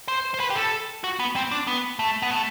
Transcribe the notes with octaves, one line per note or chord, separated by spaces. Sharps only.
C5
C5
B4
G4
A4
F#4
B3
C4
D4
B3
A3
B3
A3